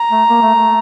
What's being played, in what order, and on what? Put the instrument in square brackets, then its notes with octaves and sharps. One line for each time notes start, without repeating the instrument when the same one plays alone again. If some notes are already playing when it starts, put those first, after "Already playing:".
Already playing: [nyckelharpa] A#5
[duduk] A3
A#3
A3
A3